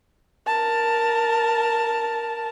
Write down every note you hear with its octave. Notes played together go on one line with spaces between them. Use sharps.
A#4 A5